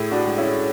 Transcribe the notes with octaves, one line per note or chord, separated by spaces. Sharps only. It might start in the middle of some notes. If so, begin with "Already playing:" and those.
Already playing: A2 E4 G#4
D4 F#4
G#3
C#4 E4